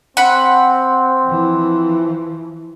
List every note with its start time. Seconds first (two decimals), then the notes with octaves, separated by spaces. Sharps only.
0.17 C4 F#5 B5
1.26 E3 F3